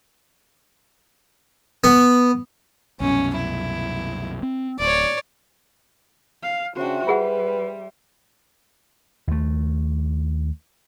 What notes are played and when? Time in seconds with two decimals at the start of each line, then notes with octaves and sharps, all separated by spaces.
1.84 B3
3.00 C2 F#2 B2 C#4
3.36 E4
4.43 C4
4.80 D1 C#5 D5
6.43 F5
6.77 C#3 D4 F#4 C5 E5 G5
7.07 G3 F4 G#4 B4 F#5
9.27 D#2 A3